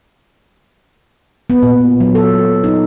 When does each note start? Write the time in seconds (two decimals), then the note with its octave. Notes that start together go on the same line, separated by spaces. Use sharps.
1.50 B3
1.63 A#2
2.00 F#3
2.15 A4
2.64 D#4